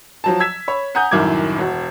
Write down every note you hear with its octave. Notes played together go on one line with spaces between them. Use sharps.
F3 F#3 A5
E6 G#6 B6 E7
C#5 B5
F#5 G#5 A#5 D#6 G6
C2 F#2 A2 D#3 D6 G#6
E1 F#4